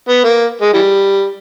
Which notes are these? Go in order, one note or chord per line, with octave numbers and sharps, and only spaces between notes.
B3
A#3
G#3
E3 G3